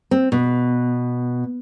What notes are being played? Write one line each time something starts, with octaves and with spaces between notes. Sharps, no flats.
C4
B2